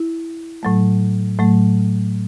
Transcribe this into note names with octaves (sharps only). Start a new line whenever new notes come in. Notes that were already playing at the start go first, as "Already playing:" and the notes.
Already playing: E4
A2 F#3 A3
A2 F#3 A3